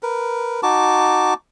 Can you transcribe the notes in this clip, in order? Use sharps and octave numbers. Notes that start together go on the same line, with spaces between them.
A#4 B4
D#4 F#4 A5 D6